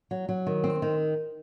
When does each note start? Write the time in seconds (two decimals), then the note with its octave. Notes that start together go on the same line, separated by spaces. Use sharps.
0.11 F#3
0.29 F#3
0.47 D#3
0.64 C4
0.82 D#3